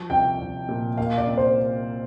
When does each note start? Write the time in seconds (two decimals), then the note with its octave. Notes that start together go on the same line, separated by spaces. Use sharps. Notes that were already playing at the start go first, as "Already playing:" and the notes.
Already playing: F3
0.10 C2 G5
0.40 C2
0.68 A#2
0.97 A#3 F5
1.18 D5
1.27 C2
1.37 C5